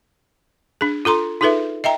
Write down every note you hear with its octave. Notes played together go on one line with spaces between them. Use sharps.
D4 G#4
F4 A4 A#5 C6
D#4 F4 G#4 A4 B4 E5
D#5 E5 G5 A#5